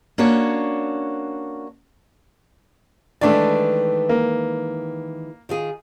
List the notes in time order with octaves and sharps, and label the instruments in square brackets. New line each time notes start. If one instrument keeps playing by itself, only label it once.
[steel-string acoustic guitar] A#3 C#4 D4 F#4 C#5
[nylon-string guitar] D#3 E3 G#3 [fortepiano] A3 D4 D5
[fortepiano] A#3
[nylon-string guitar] D#3 F4 G#4